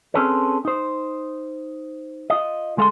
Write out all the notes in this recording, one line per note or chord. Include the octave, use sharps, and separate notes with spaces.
C4 C#4 G#4 A4 B4 C#5
D#4 C5
F4 D#5
D2 G#3 A4 F5 A5 C6